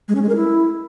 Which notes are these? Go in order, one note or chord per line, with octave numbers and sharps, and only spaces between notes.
G#3
C#4
G#3
A#4
E4